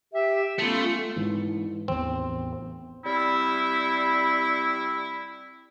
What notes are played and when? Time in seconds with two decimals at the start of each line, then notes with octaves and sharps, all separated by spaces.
0.14 G4 E5
0.58 A3 B3 C#4 F4
1.16 G#2 E3
1.88 A1 E2 C4
3.04 G3 C4 E4